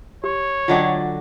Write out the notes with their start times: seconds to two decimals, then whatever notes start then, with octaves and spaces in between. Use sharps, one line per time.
0.24 G4 C#5
0.68 D3 F#3 D4 F4 D#5 G5